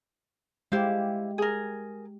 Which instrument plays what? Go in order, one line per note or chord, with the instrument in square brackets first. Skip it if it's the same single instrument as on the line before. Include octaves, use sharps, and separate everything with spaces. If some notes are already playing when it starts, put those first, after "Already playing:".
[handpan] G#3 G4 [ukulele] E4 C5 F5
[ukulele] G#4 A#4